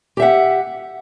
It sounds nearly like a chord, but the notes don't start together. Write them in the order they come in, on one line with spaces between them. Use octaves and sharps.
G4 E5 F#5